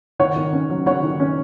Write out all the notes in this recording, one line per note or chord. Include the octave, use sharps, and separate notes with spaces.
D#3 C#5 F#5
D#3
C#4
F#3
D#3 C#5 F#5
D#3
C#4